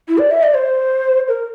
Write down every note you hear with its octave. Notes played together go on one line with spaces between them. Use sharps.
E4
D5
E5
D5
C5
A#4